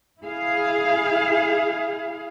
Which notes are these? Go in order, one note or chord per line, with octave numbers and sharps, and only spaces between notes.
E4 G#4 F5